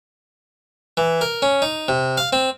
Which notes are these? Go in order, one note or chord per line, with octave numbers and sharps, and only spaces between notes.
E3
A#4
C#4
D#4
C3
F5
C4